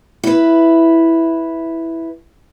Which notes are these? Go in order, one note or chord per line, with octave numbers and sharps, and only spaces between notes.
E4 B4